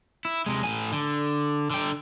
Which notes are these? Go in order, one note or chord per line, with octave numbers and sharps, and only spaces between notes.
E4
C3 G#3
A2 G#5
D3
D3 G5